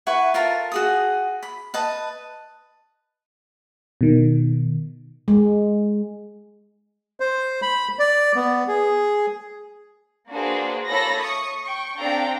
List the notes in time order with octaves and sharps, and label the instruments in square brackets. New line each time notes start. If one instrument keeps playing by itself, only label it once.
[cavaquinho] E4 B4 F#5 C#6
F4 A4 A#4 A#5
F#4 G#4 D#6
B5
B4 D#5 A5
[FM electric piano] B2 D#3
[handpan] G#3
[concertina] C5
B5
D5
B3
G#4
[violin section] A#3 D4 F#4 G#4 B4 C5
A#3 E4 A4 C#5 B5 A#6
C#6 D#6
G5 C#6
C4 D4 A4 F5 G5 A#5